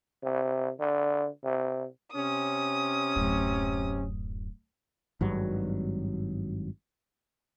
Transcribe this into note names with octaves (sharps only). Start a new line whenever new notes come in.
C3
D3
C3
C3 C#4 D#6
D1 F#2
G#1 G2 F#3